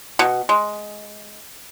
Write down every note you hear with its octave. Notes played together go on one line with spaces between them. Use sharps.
B2
G#3